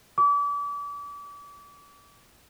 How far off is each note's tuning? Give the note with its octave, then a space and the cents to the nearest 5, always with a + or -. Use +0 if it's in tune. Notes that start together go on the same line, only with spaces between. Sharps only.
D6 -35